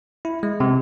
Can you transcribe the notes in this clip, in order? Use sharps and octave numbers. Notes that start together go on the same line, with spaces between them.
E4
G#3
C3